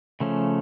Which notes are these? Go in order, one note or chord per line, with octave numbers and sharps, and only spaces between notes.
C#3 F3 A3 C#4